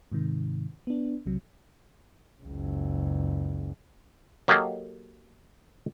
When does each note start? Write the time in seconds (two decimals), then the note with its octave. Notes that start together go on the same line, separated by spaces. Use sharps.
0.12 G#2 C3 D#3
0.87 B3 D4
1.26 B1 C3 F#3
2.43 F#1 C#2
4.48 F#3 A#3 G4 A4 D#5 F5